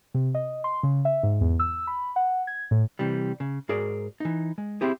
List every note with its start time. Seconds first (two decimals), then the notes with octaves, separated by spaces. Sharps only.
0.14 C3
0.35 D#5
0.64 C6
0.83 C#3
1.05 E5
1.23 G#2
1.41 E2
1.60 E6
1.87 B5
2.16 F#5
2.47 G#6
2.71 A2
2.99 C3 E3 G3
3.40 C#3
3.69 G#2 F#4 G#4 A#4 D5
4.20 E3 D#4
4.58 G#3
4.81 C4 E4 G4 G#4